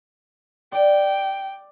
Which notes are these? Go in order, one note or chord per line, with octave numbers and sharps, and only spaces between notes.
D5 G5